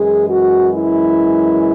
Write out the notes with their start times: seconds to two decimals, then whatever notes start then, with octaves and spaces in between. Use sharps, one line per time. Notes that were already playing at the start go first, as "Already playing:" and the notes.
Already playing: F#2 E3 G#3 G#4
0.28 F#4
0.72 E4